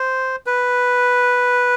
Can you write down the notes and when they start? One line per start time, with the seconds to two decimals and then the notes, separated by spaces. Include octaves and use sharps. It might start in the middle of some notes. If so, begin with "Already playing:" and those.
Already playing: C5
0.46 B4